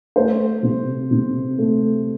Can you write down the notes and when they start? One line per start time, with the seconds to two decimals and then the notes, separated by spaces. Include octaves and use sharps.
0.16 A3 C5
0.63 C3
1.11 C3
1.58 A3